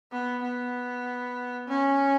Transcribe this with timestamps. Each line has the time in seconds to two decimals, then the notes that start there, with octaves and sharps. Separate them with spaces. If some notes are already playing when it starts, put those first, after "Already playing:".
0.12 B3
0.43 B3
1.68 C#4